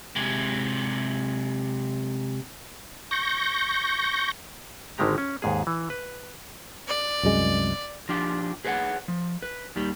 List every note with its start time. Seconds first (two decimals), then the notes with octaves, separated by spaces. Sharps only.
0.16 C3 G#3
3.11 C#6 G6 A#6
4.98 G#1 D3 D#3 G#3 G4 A#5
5.18 C#4
5.42 D#2 G#2 G#4
5.67 E3
5.90 B4
6.88 D5
7.23 C2 F#2 G#3
8.09 F3 D4 F4 G4
8.65 G#4 B4 C#5 E5 F#5
9.08 F3
9.43 B4
9.76 D#2 D#3 G3